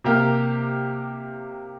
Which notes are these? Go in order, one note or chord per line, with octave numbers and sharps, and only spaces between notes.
C3 A#3 G4 A#4